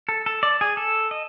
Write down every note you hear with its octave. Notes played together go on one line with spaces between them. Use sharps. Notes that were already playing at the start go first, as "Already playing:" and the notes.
A4
A4
D5
G#4
A4
D#5